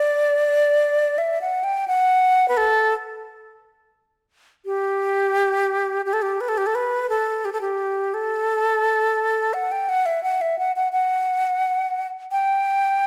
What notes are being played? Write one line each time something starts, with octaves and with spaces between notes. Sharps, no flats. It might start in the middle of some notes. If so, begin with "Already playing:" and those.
Already playing: D5
E5
F#5
G5
F#5
B4
A4
G4
G4
A4
G4
B4
A4
G4
A4
B4
A4
G4
A4
G4
A4
F#5
G5
F#5
E5
F#5
E5
F#5
F#5
F#5
G5